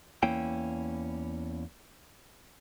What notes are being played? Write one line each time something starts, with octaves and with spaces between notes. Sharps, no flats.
E2 A#3 C#4 E4 G5